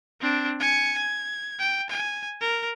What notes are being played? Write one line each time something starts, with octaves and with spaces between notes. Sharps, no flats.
C4 D4
G#5 C#7
G#6
G5
G#5
A#4